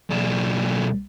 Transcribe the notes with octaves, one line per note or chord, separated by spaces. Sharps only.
B1 D4